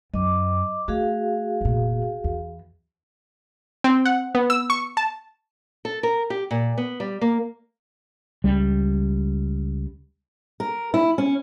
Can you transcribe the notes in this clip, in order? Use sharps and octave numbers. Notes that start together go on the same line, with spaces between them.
F#2 D#5 D6
A3 F#4 G#4 F5
F1 A#2
E2
C4
F#5
B3
E6
C#6
A5
A4
A#4
G4
A#2
B3
G3
A#3
C#2 G3
A#4
E4
C#4